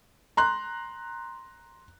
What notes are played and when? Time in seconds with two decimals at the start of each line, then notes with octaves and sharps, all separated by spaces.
0.37 A#5 C6 F#6